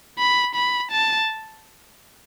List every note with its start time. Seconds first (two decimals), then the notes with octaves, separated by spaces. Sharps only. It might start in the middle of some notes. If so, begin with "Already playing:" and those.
0.18 B5
0.55 B5
0.91 A5